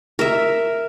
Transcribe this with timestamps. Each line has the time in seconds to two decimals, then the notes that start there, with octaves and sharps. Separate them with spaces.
0.19 A#4 E5